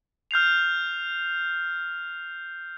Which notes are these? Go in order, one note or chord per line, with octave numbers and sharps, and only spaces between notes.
F6 G6 C7 F7